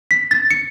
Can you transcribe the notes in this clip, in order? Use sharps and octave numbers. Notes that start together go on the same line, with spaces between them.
B6
A6
C#7